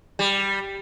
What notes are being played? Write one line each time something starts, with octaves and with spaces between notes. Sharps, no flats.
G3